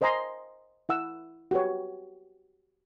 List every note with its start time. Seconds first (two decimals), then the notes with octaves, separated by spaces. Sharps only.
0.01 A#4 C5 D#5 G#5 A#5 C6
0.89 E4 F#5 E6
1.51 F#4 G4 B4 C#5